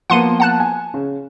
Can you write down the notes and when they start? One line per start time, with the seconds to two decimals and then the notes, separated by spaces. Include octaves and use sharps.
0.10 F3 A#3 B3 F#5 C6 D#7
0.40 F#5 A5 F#6
0.60 G#5
0.94 C#3